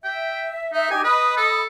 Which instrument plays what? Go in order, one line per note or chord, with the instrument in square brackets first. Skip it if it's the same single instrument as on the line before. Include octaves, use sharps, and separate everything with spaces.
[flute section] E5 [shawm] G5
[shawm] D#4 [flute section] E5
[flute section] D#4 G4 [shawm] G#5
[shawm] B4 [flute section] D#5 B5 D#6
[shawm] A4